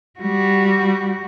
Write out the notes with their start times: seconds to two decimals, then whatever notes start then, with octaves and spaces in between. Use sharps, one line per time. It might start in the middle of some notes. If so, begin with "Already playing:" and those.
0.20 G3 F#4